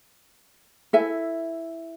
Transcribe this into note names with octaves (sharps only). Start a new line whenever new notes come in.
E4 A4 E5 G#5